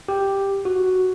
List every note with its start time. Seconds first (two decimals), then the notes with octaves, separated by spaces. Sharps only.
0.08 G4
0.65 F#4